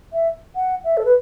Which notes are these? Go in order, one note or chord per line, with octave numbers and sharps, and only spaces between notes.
E5
F#5
E5
A4
B4